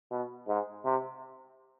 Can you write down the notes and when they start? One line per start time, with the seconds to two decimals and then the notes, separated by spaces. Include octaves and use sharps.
0.11 B2
0.48 G#2
0.85 C3